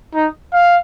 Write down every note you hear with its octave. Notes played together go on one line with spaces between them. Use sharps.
D#4
F5